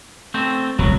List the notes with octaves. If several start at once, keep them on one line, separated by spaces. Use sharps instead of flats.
A3 C4 C5
D#1 C2 F#3